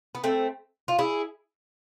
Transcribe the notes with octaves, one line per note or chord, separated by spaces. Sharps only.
B3
A3 C4
F4
E4 G#4